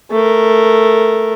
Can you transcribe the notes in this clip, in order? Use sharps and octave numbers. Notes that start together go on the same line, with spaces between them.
A3 A#4